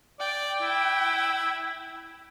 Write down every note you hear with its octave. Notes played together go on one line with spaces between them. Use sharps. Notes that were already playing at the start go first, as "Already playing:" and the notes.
D5 G5
E4